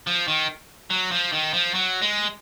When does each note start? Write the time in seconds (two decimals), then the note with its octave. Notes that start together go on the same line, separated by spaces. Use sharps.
0.07 F3
0.28 D#3
0.90 F#3
1.11 F3
1.32 D#3
1.53 F3
1.74 F#3
2.02 G#3